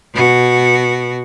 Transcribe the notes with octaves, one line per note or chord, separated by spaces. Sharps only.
B2 F#4